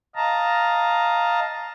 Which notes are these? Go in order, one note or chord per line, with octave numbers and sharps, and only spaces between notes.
D#5 F5 A5 A#5